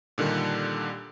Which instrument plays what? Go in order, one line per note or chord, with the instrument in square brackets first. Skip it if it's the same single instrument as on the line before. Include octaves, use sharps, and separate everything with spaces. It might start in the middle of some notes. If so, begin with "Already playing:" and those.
[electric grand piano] A#2 D3 D#3 G3